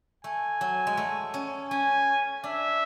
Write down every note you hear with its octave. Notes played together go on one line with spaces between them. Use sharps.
A3 G#5
F#3
G#3
A3
C#4
C#4 G#5
D4 E5